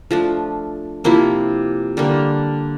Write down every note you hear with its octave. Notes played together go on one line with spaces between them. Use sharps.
F3 A3 D4
C3 F3 A#3 E4
D3 G3 A#3